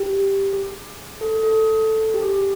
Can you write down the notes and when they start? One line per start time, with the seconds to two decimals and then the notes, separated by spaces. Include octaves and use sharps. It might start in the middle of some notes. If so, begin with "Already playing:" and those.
Already playing: G4
0.53 G#4
1.21 A4
1.43 A4
2.14 G4
2.23 G#4